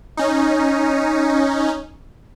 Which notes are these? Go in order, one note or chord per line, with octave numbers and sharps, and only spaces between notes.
C#4 D#4